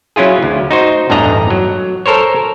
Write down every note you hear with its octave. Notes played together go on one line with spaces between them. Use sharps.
F#3 C#4 E4 F4 G#4
D2
D#4 F#4 C5
A1 E2 G2 D4 D#5 A#5
F#3
A4 A#4 C5 C#5